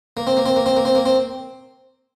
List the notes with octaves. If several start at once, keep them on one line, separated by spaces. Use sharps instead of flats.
A#3
C4
A#3
C4
A#3
C4
A#3
C4
A#3
C4